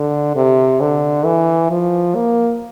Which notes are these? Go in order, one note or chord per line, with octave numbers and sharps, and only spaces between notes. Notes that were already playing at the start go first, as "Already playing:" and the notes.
Already playing: D3
C3
D3
E3
F3
A#3